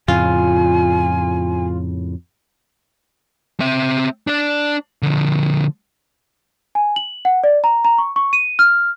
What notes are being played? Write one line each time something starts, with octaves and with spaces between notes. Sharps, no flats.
F2 A2 C#3 F4 G#5
C4 E5
D4 D5
D3 F3
G#5
F#7
F#5
D5
A#5
A#5
C#6
C#6
D#7
F6